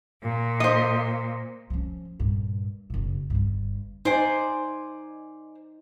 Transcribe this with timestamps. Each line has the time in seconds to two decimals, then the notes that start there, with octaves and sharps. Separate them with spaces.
0.21 A#2
0.60 C5 D#5
1.70 F3 C#4
2.20 G2 A#2
2.90 F#1 B2
3.30 G1 G2
4.05 D#4 C5 D5 G#5